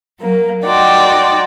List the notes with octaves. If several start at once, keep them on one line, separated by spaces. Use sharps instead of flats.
F#3 A#3
D#4 F#4 D5 G5 C6